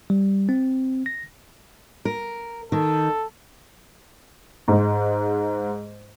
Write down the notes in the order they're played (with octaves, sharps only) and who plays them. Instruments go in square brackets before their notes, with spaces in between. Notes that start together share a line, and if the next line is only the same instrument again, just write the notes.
[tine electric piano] G3
C4
A#6
[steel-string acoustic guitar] A#4
[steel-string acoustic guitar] D#3 [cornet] A4
[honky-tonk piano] G#2 G#3